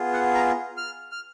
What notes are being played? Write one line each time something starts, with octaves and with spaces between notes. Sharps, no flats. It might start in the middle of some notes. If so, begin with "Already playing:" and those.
Already playing: B3 F4 G#4
F#5
A#5
F6
F6